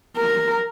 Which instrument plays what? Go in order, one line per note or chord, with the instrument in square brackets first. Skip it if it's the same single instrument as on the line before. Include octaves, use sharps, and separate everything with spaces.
[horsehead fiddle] A#4